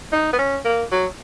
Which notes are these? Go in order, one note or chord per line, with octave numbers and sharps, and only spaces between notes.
D#4
B3
C#4
A#3
F#3